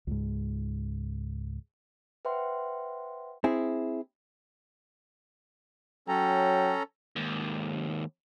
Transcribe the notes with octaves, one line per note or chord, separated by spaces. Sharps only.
C#2 G#2
B4 C5 E5 F#5 G5 C6
C4 E4 G#4
F#3 C#4 A4 G5 A#5
D#2 G#2